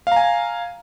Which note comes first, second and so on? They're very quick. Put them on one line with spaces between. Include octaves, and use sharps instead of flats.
F5 A#5 G#5